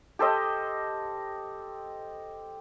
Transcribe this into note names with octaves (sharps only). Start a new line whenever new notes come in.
G4 A4 C5 D#5